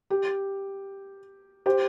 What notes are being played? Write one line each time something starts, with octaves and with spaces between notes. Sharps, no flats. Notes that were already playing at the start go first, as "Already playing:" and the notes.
G4
G4 C5